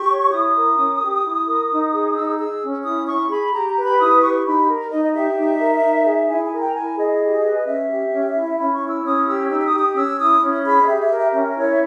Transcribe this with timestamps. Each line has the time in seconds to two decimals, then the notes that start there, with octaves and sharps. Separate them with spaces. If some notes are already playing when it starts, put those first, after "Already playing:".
Already playing: G4 C#6
0.09 C#5
0.32 E4 D#6
0.56 A#4
0.78 C#4
1.01 G4
1.25 E4
1.47 A#4
1.70 D#4
1.93 G#4
2.16 D#4 E6
2.39 G#4 E6
2.62 C#4
2.84 E4 D#6
3.08 E4 C#6
3.30 G#4 B5
3.53 G4 A#5
3.68 A#5
3.76 B4
3.84 B5
3.99 E4 D#6
4.21 G4 C#6
4.45 D#4 B5
4.68 A#4
4.90 D#4 D#5
5.04 D#5
5.14 G4 E5
5.37 D#4
5.60 A#4
5.83 D#4
6.05 G#4
6.28 E4 G#5
6.44 G#5
6.52 A#4
6.59 G5
6.67 A#5
6.74 E4 G#5
6.97 G#4 D#5
7.21 G4
7.44 B4
7.65 C#4 E5
7.89 G4
8.12 C#4
8.34 E4
8.57 C#4 B5
8.73 C#6
8.80 E4
8.88 E6
9.03 C#4 D#6
9.26 G4 E6
9.49 D#4 E6
9.60 E6
9.65 D#6
9.72 G4
9.80 D#6
9.95 C#4 E6
10.18 E4 D#6
10.41 C#4
10.64 G#4 B5
10.81 D#5
10.86 G4 E5
11.02 E5
11.10 A#4
11.18 E5
11.33 C#4 E5
11.56 E4 C#5
11.71 E5